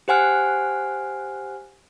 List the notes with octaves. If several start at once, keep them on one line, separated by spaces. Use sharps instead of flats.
G4 C5 F#5 G#5 F6 F#6